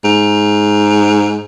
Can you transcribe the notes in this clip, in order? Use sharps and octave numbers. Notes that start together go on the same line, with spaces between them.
G#2